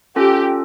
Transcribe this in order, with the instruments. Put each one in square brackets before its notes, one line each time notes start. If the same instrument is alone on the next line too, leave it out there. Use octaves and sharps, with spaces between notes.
[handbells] C#4 F4 A4 [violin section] G4